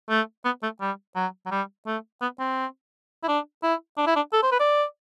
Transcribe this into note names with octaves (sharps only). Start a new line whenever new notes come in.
A3
B3
A3
G3
F#3
F#3
G3
A3
B3
C4
E4
D4
E4
D4
E4
D4
A4
C5
B4
D5